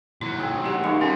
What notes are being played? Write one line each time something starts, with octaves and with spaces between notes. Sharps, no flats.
D#2 F#3 E4
C4 G#4
A2 G4 F#5
G#3 A#3 D#4 C#5
G2 C#4 A#4 C6